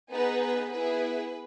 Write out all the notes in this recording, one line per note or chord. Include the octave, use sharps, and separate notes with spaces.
B3 D#4 G#4 B4
B4
B3 E4 G#4 B4